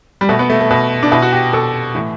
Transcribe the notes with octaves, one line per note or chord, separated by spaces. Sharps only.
G3
B2 A3
B3
A3
A3
B2
D4
B2 E4
F#4
G4
B2 A4
A2 E3